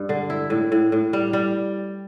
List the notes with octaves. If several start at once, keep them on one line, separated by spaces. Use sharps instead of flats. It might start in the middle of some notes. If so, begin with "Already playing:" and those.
Already playing: G2
D3
E4
A2
A2
A2
G3
G3